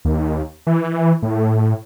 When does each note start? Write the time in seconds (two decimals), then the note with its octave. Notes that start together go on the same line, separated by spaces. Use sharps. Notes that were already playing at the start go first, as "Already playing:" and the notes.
0.05 D#2
0.67 E3
1.23 A2